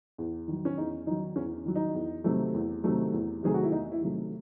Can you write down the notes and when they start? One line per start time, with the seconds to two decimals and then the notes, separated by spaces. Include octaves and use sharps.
0.18 E2
0.48 D#3 F#3
0.65 C#4
0.77 E2 D#4
1.06 D#3 F#3 D#4
1.36 E2 C#4
1.65 D#3 F#3
1.75 D#4
1.95 E2
2.24 C3 D#3 F#3 A3
2.54 E2
2.84 C3 D#3 F#3 A3
3.13 E2
3.43 C3 D#3 F#3 A3 G#4
3.54 F#4
3.63 E4
3.72 E2 D#4
3.91 E4
4.02 C3 D#3 F#3 A3